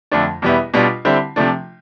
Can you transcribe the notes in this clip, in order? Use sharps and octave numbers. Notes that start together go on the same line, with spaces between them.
F2 D3 A3 D4
E2 B2 G3 B3 E4
B2 G3 D4 F4
D3 G3 C4 E4
C3 F3 A3 D4